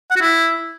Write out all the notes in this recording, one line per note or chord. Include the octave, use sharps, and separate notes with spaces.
F#5
F#4
E4